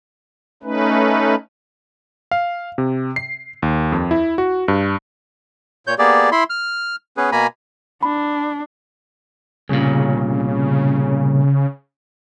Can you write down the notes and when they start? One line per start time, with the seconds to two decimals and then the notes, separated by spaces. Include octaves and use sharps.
0.63 A3 C#4 D#4 B4
2.31 F5
2.78 C3
3.16 C7
3.62 D#2
3.92 F2
4.11 E4
4.38 F#4
4.68 G2
5.87 A#2 C#5 G6
5.99 A#3 B3 G4 G#4 D5
6.32 E4 B5 C6
6.50 F6
7.17 B3 C#4 G#4 B4
7.32 B2 A#3 G#5 A#5 B5
8.03 D4 B5
9.69 C2 A#2 C#3